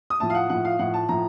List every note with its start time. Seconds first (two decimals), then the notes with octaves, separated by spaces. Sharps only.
0.10 D#6
0.20 A2 F3 A5
0.30 F5
0.35 F#5
0.49 A2 F3 F#5
0.65 F5
0.79 A2 F3 F#5
0.94 A5
1.09 A2 F3 A#5